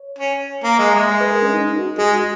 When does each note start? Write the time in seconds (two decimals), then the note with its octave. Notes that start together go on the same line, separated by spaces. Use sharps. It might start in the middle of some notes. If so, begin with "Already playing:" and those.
Already playing: C#5
0.18 C#4
0.64 A#3 A#4
0.79 G#3 D#5
0.94 G#3 E5
1.09 D#5
1.21 B4
1.32 A#4
1.42 C#4
1.54 D#4
1.77 F#4
1.98 G#3 G#4
2.14 F#4